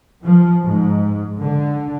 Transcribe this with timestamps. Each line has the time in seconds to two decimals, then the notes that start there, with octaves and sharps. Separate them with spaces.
0.23 F3
0.66 G#2
1.40 D3